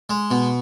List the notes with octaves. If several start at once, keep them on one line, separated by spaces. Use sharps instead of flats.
G#3
B2